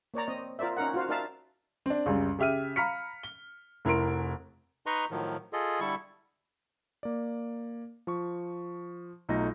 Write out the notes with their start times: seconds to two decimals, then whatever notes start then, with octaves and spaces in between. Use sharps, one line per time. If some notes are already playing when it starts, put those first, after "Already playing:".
0.14 A#3 C#5 D5 A#5
0.28 C4 D#5
0.59 F4 A#4 C5 D5 E5
0.77 C#4 D#4 A#4 F#5
0.94 F4 F#4 C5 F5
1.09 D#4 A#4 D5 E5 F5 A5
1.86 C4 D4
2.06 C#2 F#2 G3
2.39 C#3 G4 E5 F6 D#7
2.76 F5 A#5 B5 F6 B6 C#7
3.23 G7
3.85 F1 E4 A#4 C6 D7
4.86 D#4 B4 D#5 A#5 C6 C#6
5.11 A2 D#3 F3 F#3
5.53 F4 G#4 A4 D#5
5.80 D3 G3 E4 A4 C#6
7.03 A#3 D5
8.07 F3 C#6
9.29 B1 A3 D#4 F4 A#6